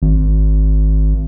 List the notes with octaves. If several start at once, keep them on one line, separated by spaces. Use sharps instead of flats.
G#1